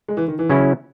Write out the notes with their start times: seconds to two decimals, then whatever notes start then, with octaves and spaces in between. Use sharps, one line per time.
0.08 G#3
0.17 E3
0.28 D#3
0.39 E3
0.50 C#3 F#3 C#4 E4